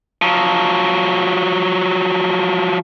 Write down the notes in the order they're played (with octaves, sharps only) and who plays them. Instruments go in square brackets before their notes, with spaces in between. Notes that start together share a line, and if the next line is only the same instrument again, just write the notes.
[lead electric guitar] F3 F#3